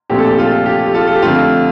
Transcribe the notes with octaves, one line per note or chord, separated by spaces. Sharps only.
A#1 A#2 A3 C4 G4
A4
G4
F4 A4
G4
G4
F4 A4
A4
G4
F2 D3 A3 C4 F4